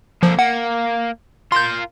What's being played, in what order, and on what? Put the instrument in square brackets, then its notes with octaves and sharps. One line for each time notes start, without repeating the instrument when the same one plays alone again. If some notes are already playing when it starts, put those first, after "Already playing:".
[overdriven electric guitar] A#2 D3 [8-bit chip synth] F3
[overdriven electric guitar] A#3 [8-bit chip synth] F#5
[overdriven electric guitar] F4 A#4 [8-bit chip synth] C6 G6